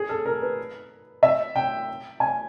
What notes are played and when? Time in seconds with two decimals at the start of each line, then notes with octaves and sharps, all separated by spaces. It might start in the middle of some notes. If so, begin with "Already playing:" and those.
Already playing: G#4
0.09 A4
0.26 A#4
0.42 B4
1.23 E5
1.56 G5
2.20 G#5